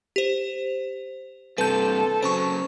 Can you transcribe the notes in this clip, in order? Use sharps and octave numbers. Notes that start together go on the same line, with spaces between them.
G4 C5
G2 C3 A4 B4 G6
C#3 F#3 C5 A5 C#6